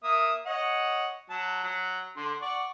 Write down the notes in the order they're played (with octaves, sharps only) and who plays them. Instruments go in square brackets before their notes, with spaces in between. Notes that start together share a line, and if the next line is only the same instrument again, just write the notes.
[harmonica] A#3 E5 D#6
C#5 D#5 F#5
F#3 A5
F#3
D3 C6
D5 F#5 C#6